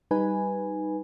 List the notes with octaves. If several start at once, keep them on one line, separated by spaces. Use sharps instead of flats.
G3 D#4 B4 G#5